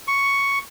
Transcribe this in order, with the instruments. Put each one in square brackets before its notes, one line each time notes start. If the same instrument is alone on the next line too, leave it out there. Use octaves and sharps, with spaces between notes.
[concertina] C#6